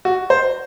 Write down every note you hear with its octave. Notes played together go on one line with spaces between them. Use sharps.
F#4
C5